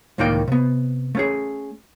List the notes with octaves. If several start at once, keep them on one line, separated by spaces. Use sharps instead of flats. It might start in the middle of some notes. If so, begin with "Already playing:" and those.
C#2 A2 D#3 A#3 D5 G5
C3 B3
A3 C#4 G#4